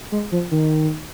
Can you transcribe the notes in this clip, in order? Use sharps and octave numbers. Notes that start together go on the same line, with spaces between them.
G#3
F3
D#3